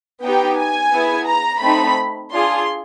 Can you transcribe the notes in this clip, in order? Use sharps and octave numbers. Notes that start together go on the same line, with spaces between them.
B3 D#4 G4 G5
G#5
B3 E4 G#4
A#5
A3 C4 D#4 B5
D4 F4 G#4 C6